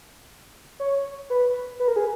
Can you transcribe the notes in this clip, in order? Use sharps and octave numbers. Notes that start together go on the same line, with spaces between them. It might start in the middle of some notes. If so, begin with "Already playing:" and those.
C#5
B4
B4
A#4
G#4